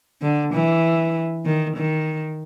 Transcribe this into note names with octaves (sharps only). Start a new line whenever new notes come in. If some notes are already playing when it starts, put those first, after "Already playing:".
D3
E3
D#3
D#3